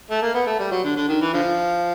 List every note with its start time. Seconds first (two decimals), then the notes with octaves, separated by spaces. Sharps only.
0.11 A3
0.23 A#3
0.35 B3
0.47 A3
0.59 G3
0.71 F#3
0.84 D3
0.97 D3
1.09 D#3
1.22 E3
1.33 D3 F3